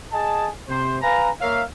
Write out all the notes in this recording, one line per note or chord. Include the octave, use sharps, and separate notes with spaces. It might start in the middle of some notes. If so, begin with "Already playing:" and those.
G#4 D#5 G#5 A5
C3 C5
B4 F5 G#5 A#5
A#3 A#4 C#5 E5 F5